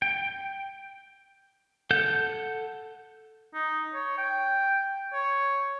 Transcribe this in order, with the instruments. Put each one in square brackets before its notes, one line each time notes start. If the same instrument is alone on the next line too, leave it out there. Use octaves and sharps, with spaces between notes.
[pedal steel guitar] G5
A4 F#5 G6
[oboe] D#4
C#5
G5
C#5